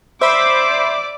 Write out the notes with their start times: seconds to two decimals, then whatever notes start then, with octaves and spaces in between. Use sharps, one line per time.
0.21 C5 D5 E5 B5 D6